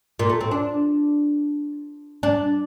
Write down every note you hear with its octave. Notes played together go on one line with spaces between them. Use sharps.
A#2
A3
C4
D4
D4